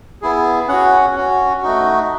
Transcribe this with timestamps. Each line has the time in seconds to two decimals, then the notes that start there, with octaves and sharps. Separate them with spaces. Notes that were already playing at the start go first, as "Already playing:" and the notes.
0.22 B3 E4 G#4
0.68 C#4 F#4 F#5
1.16 C#4 F#4
1.62 A3 D#4 F#4